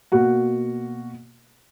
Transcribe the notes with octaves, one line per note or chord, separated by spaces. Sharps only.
B2 A#3 F#4 F#5